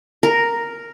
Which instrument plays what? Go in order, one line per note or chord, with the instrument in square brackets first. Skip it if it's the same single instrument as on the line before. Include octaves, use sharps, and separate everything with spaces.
[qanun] A#4